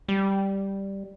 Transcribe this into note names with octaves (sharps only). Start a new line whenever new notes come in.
G3